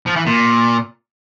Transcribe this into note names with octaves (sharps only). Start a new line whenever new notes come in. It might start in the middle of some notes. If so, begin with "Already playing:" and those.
F3
E3
A#2